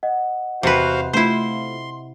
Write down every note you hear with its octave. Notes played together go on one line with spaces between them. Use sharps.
D#5 F#5
E2 C3 F#4 B4 C5 F5
A3 C4 E4 F4 C5 C6